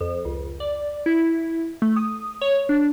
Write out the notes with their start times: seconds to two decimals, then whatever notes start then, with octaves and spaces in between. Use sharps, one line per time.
0.01 F2
0.25 C#2
0.60 D5
1.06 E4
1.82 A3
1.96 D#6
2.41 C#5
2.69 D4